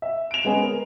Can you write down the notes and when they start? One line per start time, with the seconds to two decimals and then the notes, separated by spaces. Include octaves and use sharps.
0.02 E5
0.31 D7 F7
0.45 G#3 B3 C#4 G#4
0.63 A#4